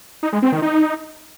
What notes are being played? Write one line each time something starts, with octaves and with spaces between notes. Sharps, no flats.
D#4
G#3
C4
D#3
D#4